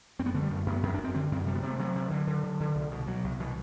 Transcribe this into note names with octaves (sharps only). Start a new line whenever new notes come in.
F#2 C4
B3
D3 A3
G3
F#2 A3
F#2 B3
F#2 C4
D4
F#2
C4
D3 C4
F#2 C4
C3 G3
B3
C3 C4
A3
C3 F#3
C3
D3
D3
D3
D3
C2
B2
B2 F#3
C2
B2 E3